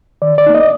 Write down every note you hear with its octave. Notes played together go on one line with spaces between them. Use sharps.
D#3 D5
D5
A#3 D#4
D#5